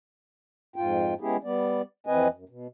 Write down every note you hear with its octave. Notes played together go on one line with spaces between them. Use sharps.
F2 G#2 F4 G5
G#3 B3 C#4 E4 G4 G#4
G3 B3 D5
F2 E3 C4 B4 D#5 G#5
F#2
B2